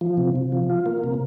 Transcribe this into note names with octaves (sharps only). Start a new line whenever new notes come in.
F3
C3
C3
F3
F4
A#3
C3